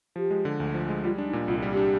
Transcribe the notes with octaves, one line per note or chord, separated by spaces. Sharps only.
F3 G4
G#3
D3
D2
F3
G#3
G3 F4
D4
D#4
A#2
C2 F4
G3
G4
D4